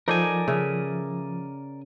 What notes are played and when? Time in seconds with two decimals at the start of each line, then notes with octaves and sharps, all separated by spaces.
0.08 F3 D#4 A4 A#4 C5 D5 G#5
0.48 C#3 E5